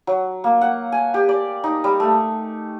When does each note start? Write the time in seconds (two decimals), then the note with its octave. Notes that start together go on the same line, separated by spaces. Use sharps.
0.07 F#3
0.44 A#3
0.61 F#5
0.92 G#5
1.14 G4
1.29 D5
1.64 D#4
1.84 G3
2.00 A3